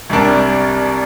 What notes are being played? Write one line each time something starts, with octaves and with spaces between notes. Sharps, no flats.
C2 C3 G3 D4 A#4